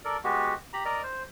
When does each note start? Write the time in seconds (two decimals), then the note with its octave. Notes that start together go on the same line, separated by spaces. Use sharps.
0.05 A4 A#4 D5
0.24 G#3 B3 F#4 G4
0.73 G4 A#5 B5
0.85 A#4 D5 D#5 A#5
1.03 C5